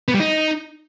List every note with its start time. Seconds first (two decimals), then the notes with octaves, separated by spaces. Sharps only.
0.08 B3
0.14 G3
0.20 D#4